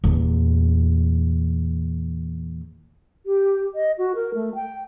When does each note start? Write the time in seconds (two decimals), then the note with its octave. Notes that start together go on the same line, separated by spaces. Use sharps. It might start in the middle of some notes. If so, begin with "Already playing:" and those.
0.04 E2 A#2
3.26 G4
3.75 D#5
3.98 F#4
4.15 A#4
4.34 A3
4.55 G5